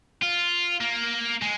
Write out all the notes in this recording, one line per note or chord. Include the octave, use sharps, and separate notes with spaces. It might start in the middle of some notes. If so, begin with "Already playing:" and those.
F4
A#3
G#3